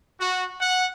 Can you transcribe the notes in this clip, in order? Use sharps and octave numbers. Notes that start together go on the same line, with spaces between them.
F#4
F#5